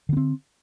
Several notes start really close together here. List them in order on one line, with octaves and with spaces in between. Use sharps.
D3 B3 C4